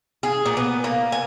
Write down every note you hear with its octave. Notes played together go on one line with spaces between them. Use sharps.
G#4
A#2
B3
A#3
G#5